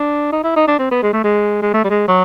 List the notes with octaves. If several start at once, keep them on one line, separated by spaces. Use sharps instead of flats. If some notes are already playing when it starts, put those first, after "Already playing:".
Already playing: D4
D#4
E4
D#4
D4
C4
B3
G#3
A3
G#3
G#3
A3
G3
G#3
F#3